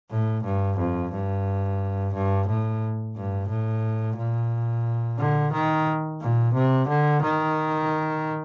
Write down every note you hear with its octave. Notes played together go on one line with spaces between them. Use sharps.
A2
G2
F2
G2
G2
A2
G2
A2
A#2
D3
D#3
A#2
C3
D3
D#3